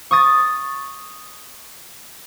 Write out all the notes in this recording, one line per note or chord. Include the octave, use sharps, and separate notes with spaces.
C#6 D#6 A6